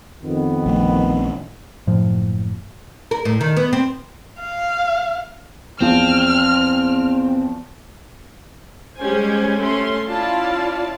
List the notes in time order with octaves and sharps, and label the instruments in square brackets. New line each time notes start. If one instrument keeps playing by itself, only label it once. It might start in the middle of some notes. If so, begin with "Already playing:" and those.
[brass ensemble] F2 D#3 B3
[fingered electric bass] A#1 A3
[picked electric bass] F#1 A2 F3
[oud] A#4
A2
D#3
B3
C4
[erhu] F5
[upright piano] E2 F3 [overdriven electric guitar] C4 [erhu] F6
[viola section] G3 G#3 C#4 G4 C5 G#5
A3 C#4 C6
C#4 E4 F4 D5 F5 A5